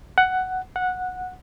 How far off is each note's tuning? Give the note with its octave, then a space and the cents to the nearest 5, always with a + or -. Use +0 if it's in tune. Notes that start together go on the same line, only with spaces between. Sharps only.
F#5 +10
F#5 -10